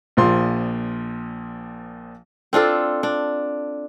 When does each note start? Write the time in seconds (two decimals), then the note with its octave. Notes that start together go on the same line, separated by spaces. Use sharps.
0.17 A#1 A#2 F3 C6
2.53 C4 D4 F4 A4
3.03 D4